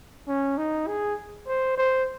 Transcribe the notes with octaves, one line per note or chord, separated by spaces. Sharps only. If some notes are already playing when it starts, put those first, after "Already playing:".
C#4
D#4
G#4
C5
C5